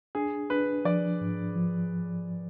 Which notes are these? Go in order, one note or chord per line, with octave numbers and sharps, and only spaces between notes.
D4 G#4
D4 B4
F3 D5
G#2
F3